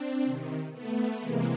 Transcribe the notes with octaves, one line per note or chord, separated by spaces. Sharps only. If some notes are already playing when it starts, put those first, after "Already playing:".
Already playing: C4 D4
C3 D#3
A3 B3
C3 E3 G#3 A#3